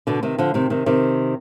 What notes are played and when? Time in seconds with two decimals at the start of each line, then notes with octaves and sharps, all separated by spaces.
0.07 B2 D3
0.23 C3 D#3
0.38 D3 F3
0.54 C3 D#3
0.70 C3 D#3
0.86 C3 D#3